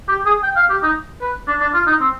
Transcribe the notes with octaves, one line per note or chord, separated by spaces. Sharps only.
G4
G#4
G5
F5
G4
D#4
B4
D4
D4
F4
D#4
C4